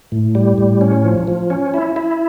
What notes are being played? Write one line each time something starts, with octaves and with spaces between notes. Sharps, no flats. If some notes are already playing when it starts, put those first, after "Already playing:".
A2
G3
A2
C#4
F3
F3
C#4
E4
E4